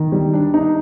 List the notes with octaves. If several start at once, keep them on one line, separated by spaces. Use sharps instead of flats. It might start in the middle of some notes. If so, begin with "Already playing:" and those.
Already playing: D#3
G3
D4
D#4